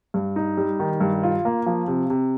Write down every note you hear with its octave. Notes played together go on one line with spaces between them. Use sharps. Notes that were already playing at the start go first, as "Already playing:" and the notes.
G2
D#4
G3
D#3
G2
F4
A#3
F3
C3
C3